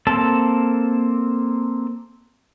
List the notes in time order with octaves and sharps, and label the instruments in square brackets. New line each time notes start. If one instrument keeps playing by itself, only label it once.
[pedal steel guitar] A#3 C4 A4 A5